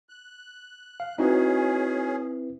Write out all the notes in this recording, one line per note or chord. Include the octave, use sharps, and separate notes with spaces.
F#6
F5
C4 C#4 D#4 E4 F#4 G#4 B4